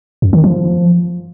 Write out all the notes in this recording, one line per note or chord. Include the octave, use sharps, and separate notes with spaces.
F#2
D#3
F3